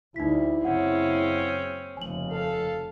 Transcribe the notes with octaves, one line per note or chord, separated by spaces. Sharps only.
D2 G3 D#4 E4 B6
F#1 C#3 C4 C#4 F#5
F1 D#2 C#3 G#5 F#7
A4 F5